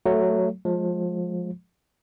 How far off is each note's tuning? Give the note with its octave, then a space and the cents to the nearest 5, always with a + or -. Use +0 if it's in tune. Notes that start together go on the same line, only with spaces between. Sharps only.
F#3 +0 A3 +0
F3 +25 G#3 +20